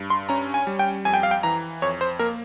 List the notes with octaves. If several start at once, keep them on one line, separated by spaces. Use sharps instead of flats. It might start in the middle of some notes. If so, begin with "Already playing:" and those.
Already playing: G2
C6
C#4 A#5
G#5
G3
G5
F2 G#5
G5
F5
G5
E3 A#5
F2 C#5
C5
A#3 A#4